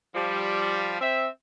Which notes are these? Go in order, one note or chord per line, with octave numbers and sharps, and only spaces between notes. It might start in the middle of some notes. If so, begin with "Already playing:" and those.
F3 G3
C4 E5